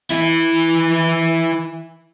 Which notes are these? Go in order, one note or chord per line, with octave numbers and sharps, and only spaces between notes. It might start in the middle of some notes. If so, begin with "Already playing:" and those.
E3 E4